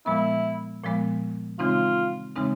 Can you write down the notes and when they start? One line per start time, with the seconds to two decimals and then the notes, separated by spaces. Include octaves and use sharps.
0.06 A#2 F3 G#3 B3 E4
0.83 A#2 F3 G#3 B3
1.59 C#3 E3 G#3 C4 D#4 F4
2.36 C#3 E3 G#3 C4 D#4